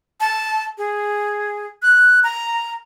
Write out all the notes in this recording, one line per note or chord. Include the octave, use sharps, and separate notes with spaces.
A5
G#4
F#6
A#5